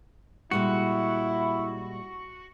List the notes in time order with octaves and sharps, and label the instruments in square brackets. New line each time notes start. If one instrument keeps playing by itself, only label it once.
[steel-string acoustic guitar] A#2 G3 G#3 [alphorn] E4 [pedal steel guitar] F#4